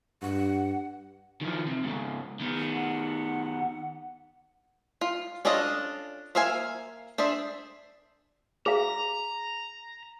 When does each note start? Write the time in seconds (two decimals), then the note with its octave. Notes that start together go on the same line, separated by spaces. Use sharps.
0.22 G2 F#5
1.41 D#3 F3
1.67 C3
1.84 G#2 C#3
2.40 D#3 B3
2.75 F#5
5.01 F4
5.45 C#4 D4 F4 A4 D#5
6.35 A#3 C5 E5 F5 G#5
7.18 D4 G#4 C5 E5
8.66 G#4 F5 A#5